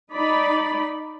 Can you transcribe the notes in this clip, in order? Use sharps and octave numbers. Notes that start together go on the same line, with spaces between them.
D#4 D5 B5